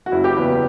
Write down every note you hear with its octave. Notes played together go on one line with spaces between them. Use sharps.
F#4
F#1 E4
G4
E2 C#3 B4